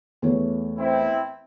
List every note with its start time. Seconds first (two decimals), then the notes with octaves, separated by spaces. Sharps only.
0.22 E2 A3 C#5
0.78 C4 E4